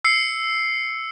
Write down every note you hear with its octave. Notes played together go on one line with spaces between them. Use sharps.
E6 C7 C#7